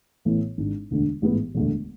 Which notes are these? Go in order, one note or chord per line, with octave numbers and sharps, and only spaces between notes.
A1 A2 E3 B3 E4
G#1 G#2 G#3 D4
E1 D2 D3
A1 G#2 E3 B3
E1 D2 D3 A3